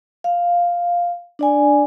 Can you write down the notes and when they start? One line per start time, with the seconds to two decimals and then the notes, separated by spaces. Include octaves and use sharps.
0.24 F5
1.39 D4 D5 G#5